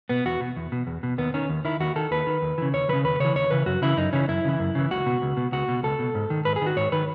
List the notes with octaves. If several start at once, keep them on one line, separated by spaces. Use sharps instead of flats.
B2 B3
E2 F#4
B2
E2
B2
E2
B2
D#2 B3
D#3 C#4
D#2
D#3 E4
D#2 F#4
D#3 A4
D#2 B4
D#3
D#2
C#3 E3
D#2 C#5
C#3 E3 B4
D#2 B4
C#3 E3 C#5
D#2 C#5
C#3 E3 B4
F#2 F#4
C#3 E3 E4
F#2 D#4
C#3 E3 C#4
F#2 E4
C#3 E3
F#2
C#3 E3
C#2 F#4
B2
C#2
B2
C#2 F#4
B2
C#2 A4
B2
G#2
D#3
G#2 B4
G#4
D#3
F#4
G#2 C#5
D#3 B4